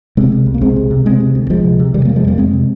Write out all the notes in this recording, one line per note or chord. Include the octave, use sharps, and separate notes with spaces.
C3 G#3 C4
C3
C2
A#3
C2 G#3 C4
C3
C3
C3 G#3 C4
C3
D2
D2 F3 G#3
C3
C3
C3 D#3 G3
G3 A#3
C3
F3 G#3
F2 G3 A#3
F2 G#3 C4
C3